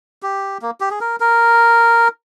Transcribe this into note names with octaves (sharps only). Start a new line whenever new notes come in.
G4
A#3
G4
G#4
A#4
A#4